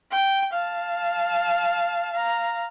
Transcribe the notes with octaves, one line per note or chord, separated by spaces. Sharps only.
G5
F5 A5
F5 A#5